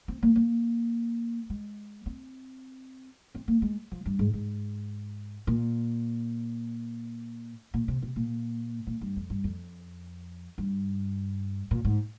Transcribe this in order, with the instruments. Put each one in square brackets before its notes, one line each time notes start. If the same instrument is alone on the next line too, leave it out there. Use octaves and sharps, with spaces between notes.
[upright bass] C4
A#3
A#3
G#3
C4
C4
A#3
G#3
F3
G2
G#2
G#2
A#2
A#2
C3
C3
A#2
A#2
G2
F2
G2
F2
G2
A#2
G#2